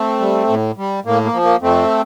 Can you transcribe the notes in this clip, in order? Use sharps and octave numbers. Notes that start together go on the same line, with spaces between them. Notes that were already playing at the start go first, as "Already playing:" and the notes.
Already playing: A3 C4
G3
A2
G3
A2 A#3
A#3
F3
A#3
F2 A3 C4